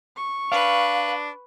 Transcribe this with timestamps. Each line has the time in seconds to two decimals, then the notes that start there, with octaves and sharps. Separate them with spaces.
0.16 C#6
0.52 D4 B4 F5